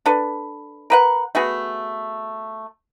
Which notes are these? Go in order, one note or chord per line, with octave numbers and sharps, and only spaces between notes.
D4 A4 B4
A#4 B4 F#5
A3 B3 F#4 G#4